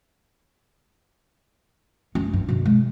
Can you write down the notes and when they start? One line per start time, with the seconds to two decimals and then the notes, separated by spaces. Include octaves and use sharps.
2.15 F#2 C#4
2.33 G2
2.48 B2 D#3
2.66 G#3